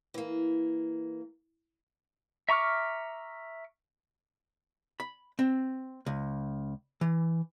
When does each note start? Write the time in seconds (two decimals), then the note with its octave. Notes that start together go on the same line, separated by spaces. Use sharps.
0.14 E3 A#3
2.49 E5 A#5 C#6 D6 F6
5.00 B5
5.39 C4
6.06 C#2
7.01 E3